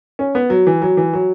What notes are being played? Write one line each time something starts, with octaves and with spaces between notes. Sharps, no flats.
C#4
B3
F#3
E3
F#3
E3
F#3